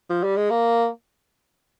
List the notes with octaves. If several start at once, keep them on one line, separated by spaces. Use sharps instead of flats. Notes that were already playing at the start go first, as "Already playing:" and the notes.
F3
G3
G#3
A#3